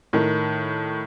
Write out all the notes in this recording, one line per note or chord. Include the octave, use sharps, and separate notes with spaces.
A2 D#3